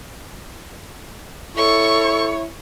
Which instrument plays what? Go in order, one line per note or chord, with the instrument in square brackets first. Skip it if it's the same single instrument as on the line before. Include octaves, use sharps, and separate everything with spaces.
[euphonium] E4 [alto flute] A4 [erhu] C#5 [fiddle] C#6